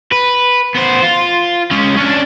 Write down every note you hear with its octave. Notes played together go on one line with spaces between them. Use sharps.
B4
B3 C5
F4
G#3 C#4
C#4 D4